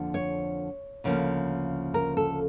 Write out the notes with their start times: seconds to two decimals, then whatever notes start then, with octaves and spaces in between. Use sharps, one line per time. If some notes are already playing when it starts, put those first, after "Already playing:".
Already playing: F2 D3 F3 A#3
0.14 C#5
1.04 D2 C#3 F3 A#3
1.94 A#4
2.17 A4